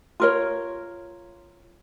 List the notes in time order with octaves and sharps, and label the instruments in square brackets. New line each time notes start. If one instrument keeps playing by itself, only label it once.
[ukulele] F4 A#4 C#5